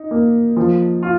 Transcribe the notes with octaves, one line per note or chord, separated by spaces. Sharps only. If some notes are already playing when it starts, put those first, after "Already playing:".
Already playing: D#4
A#3
F3
F4